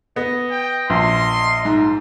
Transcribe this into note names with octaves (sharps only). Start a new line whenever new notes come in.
B3 D#5
G5
A#1 C6
G#2